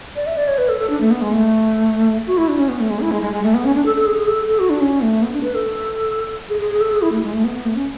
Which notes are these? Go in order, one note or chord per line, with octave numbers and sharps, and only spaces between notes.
D5
E5
D5
C#5
B4
A4
A4
D4
A3
B3
G#3
A3
F#4
E4
D4
C#4
B3
A3
G#3
E4
G#3
G#3
G#3
A3
B3
C#4
D4
A4
A4
G#4
G#4
A4
A4
F#4
D4
C#4
A3
B3
D4
B4
A4
G#4
G#4
G#4
A4
G#4
E4
A3
G#3
A3
B3
B3
A3
C#4